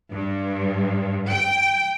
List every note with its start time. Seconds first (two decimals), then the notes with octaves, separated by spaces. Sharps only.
0.13 G2
1.29 G5